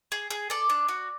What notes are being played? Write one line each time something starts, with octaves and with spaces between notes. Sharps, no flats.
G#4
G#4
A4 D5
D4
F#4